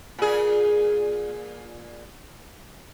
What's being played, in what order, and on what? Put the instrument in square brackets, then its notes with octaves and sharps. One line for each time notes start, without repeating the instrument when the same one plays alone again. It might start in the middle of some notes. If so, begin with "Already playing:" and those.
[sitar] A#2 G#4